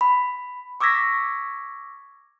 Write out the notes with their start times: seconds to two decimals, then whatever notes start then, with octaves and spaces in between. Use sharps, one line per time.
0.01 B5
0.80 C#6 D6 E6 G#6 A#6 B6